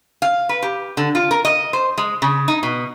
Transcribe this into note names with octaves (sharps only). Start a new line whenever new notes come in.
F5
B4
G4
D3
F4
A#4
D#5
C5
G#3
C#3
D#4
B2